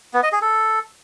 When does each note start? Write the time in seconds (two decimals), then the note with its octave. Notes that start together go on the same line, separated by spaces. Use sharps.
0.14 B3
0.23 D#5
0.32 G#4
0.42 A4